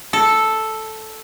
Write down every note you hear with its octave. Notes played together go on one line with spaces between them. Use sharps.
A4